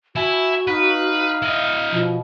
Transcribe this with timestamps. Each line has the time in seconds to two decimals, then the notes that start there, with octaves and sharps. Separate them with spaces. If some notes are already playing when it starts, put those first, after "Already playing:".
0.16 E4 F#4 G#5
0.67 D#4 B4 F5
1.42 E4 D#5
1.91 B2 F3